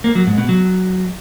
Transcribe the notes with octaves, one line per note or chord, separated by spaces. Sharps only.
A#3
F#3
G#2
B2
F#3